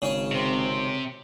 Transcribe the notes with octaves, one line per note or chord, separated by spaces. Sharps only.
G#1 C#3 C#4
C3 C4